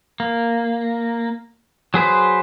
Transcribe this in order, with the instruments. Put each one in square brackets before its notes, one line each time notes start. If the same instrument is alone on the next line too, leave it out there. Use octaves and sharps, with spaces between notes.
[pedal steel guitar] A#3
F#3 G#4 B4 C5